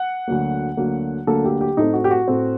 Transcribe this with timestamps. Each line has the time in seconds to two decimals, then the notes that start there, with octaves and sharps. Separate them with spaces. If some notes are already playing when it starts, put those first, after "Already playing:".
Already playing: F#5
0.28 D2 D3 F#3 A#3
0.77 D2 D3 F#3 A#3
1.27 D2 D3 F#3 A#3 A4
1.44 G4
1.61 G4
1.77 A2 A3 C4 D#4
1.93 F#4
2.04 G4
2.11 F#4
2.28 A2 A3 C4